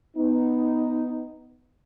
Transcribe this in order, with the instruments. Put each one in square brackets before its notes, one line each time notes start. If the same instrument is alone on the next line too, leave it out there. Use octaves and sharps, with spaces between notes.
[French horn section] B3 D#4